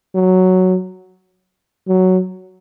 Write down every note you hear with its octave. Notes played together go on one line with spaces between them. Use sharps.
F#3
F#3